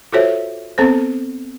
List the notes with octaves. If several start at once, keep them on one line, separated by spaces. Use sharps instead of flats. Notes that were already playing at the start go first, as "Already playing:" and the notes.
F4 F#4 A4 C5 C#5 E5
B3 C4 A4 C5